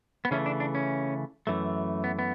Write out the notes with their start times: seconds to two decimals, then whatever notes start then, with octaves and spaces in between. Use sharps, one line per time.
0.25 B3
0.31 C#3 E3 A3 C#4
0.46 D4
0.60 D4
0.75 C#4
1.47 F#2 E3 A3
2.04 B3
2.19 B3